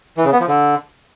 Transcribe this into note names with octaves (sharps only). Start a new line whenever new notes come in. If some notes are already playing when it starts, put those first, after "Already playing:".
E3
C#3
B3
F3
D3